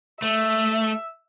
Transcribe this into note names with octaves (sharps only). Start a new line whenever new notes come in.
A3 E5